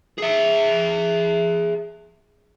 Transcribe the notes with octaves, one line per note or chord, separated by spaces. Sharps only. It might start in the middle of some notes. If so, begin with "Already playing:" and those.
G#4 E5